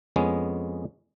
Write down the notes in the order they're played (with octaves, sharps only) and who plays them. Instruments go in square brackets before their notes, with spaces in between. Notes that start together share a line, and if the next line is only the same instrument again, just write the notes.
[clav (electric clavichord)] F2 G#3 B3 C#4